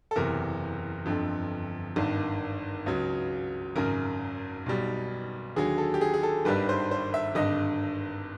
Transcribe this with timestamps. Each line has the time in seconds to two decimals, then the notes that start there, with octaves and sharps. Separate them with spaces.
0.11 A4
0.16 F#1 E2 C3 A#4
1.06 G1 F2 D3
1.96 G#1 G2 D#3
2.86 C#2 C#3 F#3
3.76 G#1 F#2 C#3 A#4
4.66 B1 B2 G3
5.56 D#2 D3 F#3 G#4
5.78 A4
5.94 G4
6.01 G#4
6.14 G#4
6.23 A4
6.45 G#1 G2 D#3 G3 B4
6.69 C5
6.91 C5
7.14 E5
7.35 G#1 G2 D3 D#5